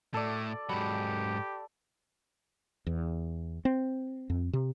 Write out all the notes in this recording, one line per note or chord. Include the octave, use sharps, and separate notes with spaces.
A2 A4 D5
G#2 F#3 G4 B5
E2
C4
F2
C3